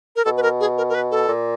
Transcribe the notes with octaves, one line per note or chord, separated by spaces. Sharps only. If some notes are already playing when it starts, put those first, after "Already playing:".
A#4
B2 A4
B4
A#4
G#4
A#4
A#4
B4
A4
A#2